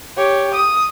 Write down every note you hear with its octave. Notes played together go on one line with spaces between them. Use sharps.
G4 C#5
D#6